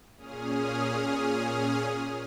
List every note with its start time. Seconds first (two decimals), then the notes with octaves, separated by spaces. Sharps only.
0.17 A#2 C#4 G#4 D#6 F6